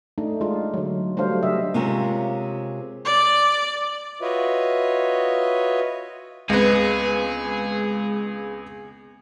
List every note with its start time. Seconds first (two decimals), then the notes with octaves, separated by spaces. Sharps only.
0.18 A3 D4 D#4
0.41 G#3 D4 D#4 F4
0.74 D3 F#3
1.17 F#3 G3 A3 D4 C5 F5
1.43 C#3 D4 G4 D#5 E5
1.74 C3 G#3 C4 C#4 F4 A#4
3.05 D5
4.22 F4 F#4 B4 C#5 D#5 E5
6.49 C#2 G#3 B3 C4 G#4 B4